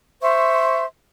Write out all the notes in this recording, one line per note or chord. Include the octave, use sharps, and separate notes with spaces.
C5 E5 C6 C#6